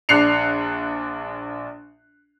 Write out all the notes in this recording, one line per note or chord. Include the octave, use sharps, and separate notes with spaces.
A#1 D4 F#6 C7 C#7 F7